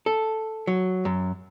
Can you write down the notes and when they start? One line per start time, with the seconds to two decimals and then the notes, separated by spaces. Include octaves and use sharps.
0.06 A4
0.67 F#3
1.05 F#2